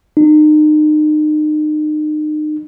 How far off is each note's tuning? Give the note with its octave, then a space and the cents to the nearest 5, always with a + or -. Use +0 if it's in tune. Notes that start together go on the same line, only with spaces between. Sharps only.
D#4 -35